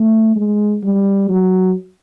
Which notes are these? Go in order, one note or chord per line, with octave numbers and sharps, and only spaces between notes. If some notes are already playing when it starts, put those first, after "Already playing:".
Already playing: A3
G#3
G3
F#3